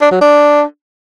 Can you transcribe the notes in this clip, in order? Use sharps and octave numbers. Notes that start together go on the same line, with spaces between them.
D4
F#3
D4